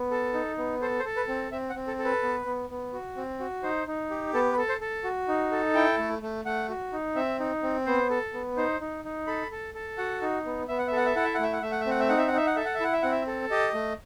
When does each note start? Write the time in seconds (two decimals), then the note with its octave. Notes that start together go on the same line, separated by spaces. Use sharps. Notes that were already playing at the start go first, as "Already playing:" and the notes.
Already playing: B3
0.11 A4
0.34 D#4
0.58 B3
0.81 A4 C5
0.99 C5
1.05 A4
1.17 B4
1.28 C4
1.52 C4 E5
1.70 F#5
1.75 C4
1.87 A4
1.99 A4
2.05 B4
2.23 B3
2.46 B3
2.70 B3
2.93 F#4
3.17 C4
3.40 F#4
3.63 D#4 C5
3.87 D#4
4.10 G4
4.34 B3 A4
4.52 B4
4.58 A4
4.69 C5
4.81 A4
5.04 F#4
5.28 D#4
5.52 A4
5.75 E4 G5
5.98 A3
6.22 A3
6.45 A3 F#5
6.69 F#4
6.93 D#4
7.15 C4 E5
7.40 D#4
7.63 C4
7.86 B3 C5
8.10 A4
8.34 B3
8.57 D#4 C5
8.81 D#4
9.05 D#4
9.27 A4 B5
9.51 A4
9.74 A4
9.98 F#4 F#5
10.22 D#4
10.46 B3
10.68 B3 E5
10.78 F#5
10.87 E5
10.92 A4 F#5
11.06 E5
11.16 E4 F#5
11.25 E5
11.34 F#5
11.39 A3 E5
11.53 F#5
11.62 A3 E5
11.71 F#5
11.81 E5
11.86 C4 F#5
12.00 E5
12.09 D#4 F#5
12.18 E5
12.28 F#5
12.33 D#4 E5
12.47 F#5
12.56 A4 E5
12.65 F#5
12.74 E5
12.80 E4 F#5
12.93 E5
13.02 C4 F#5
13.12 E5
13.27 A4
13.51 G4 D#5
13.74 A3